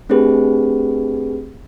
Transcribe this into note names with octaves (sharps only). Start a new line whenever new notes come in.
A3 C4 D4 G4 G#4 B4